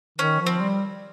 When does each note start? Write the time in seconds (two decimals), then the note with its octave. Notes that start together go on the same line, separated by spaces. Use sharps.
0.18 D#3 C#4
0.40 F3
0.46 C4
0.60 G3